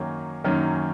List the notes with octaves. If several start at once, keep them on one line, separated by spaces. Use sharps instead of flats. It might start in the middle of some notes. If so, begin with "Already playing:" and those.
Already playing: F#2 D#3 F#3 A#3 C#4
F#2 D#3 F#3 A#3 C#4